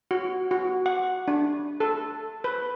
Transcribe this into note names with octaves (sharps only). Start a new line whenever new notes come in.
F#4
F#4
F#5
D4
A4
B4